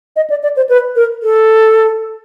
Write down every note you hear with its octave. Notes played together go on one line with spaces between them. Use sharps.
D#5
D5
D5
C5
B4
A#4
A4